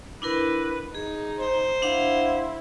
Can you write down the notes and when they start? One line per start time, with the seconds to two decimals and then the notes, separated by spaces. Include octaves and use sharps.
0.22 D4 E4 A#4 B4
0.95 D#4 G#4
1.40 C5 A#5
1.82 D4 E4 F5 F#5